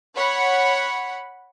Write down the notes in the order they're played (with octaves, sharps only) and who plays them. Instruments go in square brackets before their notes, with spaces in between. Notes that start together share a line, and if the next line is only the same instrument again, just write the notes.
[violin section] C#5 F#5 B5